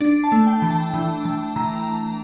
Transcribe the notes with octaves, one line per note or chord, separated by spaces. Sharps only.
D4
A5
A3
G5
E3
A5
E3 G5
E3 A5
E3 A#5